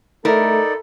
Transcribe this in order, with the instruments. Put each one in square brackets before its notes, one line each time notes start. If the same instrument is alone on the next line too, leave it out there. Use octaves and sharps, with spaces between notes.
[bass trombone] A3 [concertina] D#4 D5 [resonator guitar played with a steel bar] E4 A#4 [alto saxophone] A4